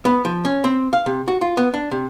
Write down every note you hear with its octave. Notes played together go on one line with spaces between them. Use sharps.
B3
F3
C#4
C4
F5
C3
F#4
F4
B3
D4
C3